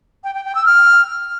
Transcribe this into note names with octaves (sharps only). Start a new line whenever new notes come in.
G5
G5
G5
E6
F6